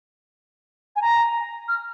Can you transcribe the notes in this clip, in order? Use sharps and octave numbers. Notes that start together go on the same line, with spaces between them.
G#5
A#5
F6